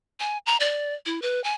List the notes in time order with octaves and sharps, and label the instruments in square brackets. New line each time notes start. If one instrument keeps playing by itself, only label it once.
[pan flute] G#5
A#5
D5
E4
B4
G#5